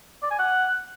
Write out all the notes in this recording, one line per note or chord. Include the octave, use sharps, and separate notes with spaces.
D5
G#5
F#5